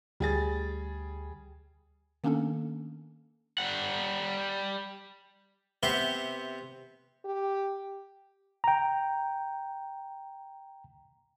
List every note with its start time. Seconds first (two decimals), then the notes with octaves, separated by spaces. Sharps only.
0.20 D2 G3 G#4 A6
2.24 D#3 A#3 B3 C#4 D4 A4
3.58 G3 F#5
5.83 C3 B3 C4 G4 E5 C6
7.25 G4
8.64 G5 A#5